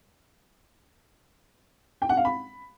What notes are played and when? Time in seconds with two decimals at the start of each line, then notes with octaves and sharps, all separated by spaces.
2.02 G5
2.09 F#5
2.17 F5
2.25 B5